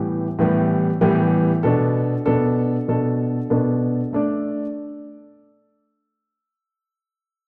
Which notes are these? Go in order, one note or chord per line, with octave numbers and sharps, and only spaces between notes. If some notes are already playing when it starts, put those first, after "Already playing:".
Already playing: A2 E3 G3 B3 G4
A2 E3 G3 B3 G4
A2 E3 G3 B3 G4
B2 B3 D4 A4
B2 B3 D4 A4
B2 B3 D4 A4
B2 B3 D4 A4
A3 D4 A4 D5